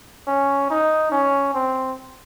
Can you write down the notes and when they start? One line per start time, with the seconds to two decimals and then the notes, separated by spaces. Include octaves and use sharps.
0.27 C#4
0.70 D#4
1.12 C#4
1.54 C4